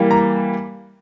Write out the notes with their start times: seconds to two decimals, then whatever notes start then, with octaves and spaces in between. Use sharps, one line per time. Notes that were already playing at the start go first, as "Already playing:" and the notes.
Already playing: E3 G3 A#3
0.11 A#5